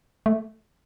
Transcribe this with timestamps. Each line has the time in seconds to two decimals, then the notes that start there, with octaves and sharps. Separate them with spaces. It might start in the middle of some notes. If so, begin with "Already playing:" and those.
0.26 A3